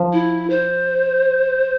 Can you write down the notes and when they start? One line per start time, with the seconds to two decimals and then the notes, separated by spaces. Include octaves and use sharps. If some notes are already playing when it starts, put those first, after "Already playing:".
Already playing: F3
0.13 E4
0.50 C5